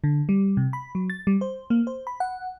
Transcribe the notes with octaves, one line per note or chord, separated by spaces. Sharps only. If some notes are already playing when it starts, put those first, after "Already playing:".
D3
G3
C3
B5
F#3
A6
G3
C5
A#3
C5
B5
F#5